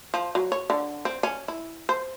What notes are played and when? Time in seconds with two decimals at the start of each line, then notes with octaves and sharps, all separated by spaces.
0.14 F3
0.35 F#3
0.52 C#5
0.70 D3
1.05 C4
1.23 C#4
1.48 E4
1.89 C5